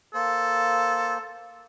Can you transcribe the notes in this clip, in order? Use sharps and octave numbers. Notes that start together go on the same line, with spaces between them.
A#3 A4 C5